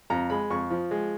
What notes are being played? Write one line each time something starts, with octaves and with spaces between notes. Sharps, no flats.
F2 A#5
G#3 B5
F2 C#6
F3
G#3